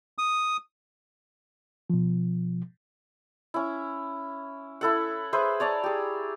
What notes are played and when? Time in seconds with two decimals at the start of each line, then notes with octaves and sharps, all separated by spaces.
0.18 D#6
1.90 B2 F3
3.54 C#4 E4
4.81 E4 A4 F#5
5.33 G#4 B4 C5 E5
5.60 C#5 D5 A5 A#5
5.84 G4 G#4